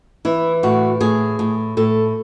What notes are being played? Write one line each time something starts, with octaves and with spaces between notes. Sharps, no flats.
E3 E4
A2 F#4
A2 G#4
A2
A2 A4